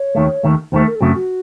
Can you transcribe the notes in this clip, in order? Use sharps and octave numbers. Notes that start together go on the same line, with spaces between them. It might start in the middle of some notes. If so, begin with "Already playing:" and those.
Already playing: C#5
D#2 D#3 A3
D#2 D#3 A3
D#2 D#3 A3 C5
A#4
A4
F#2 C#3 A3 C4 F#4
F#4